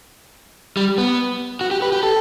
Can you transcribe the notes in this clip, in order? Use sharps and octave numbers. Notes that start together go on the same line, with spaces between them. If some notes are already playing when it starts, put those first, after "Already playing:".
G3
B3
F#4
G4
B4
G4
A4